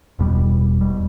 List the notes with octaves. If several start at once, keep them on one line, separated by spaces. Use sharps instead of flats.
E1 E2 B2 G3
E1 E2 B2 G3